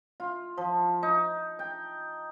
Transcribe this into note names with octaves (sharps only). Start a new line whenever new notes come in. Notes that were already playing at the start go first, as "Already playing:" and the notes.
F4
F3
D#4
G5